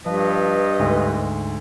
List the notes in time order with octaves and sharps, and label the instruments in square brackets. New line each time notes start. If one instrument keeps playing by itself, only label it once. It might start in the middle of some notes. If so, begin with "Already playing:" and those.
[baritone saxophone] G2 [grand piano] F3 [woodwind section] B4 D#5
[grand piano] D2 G#2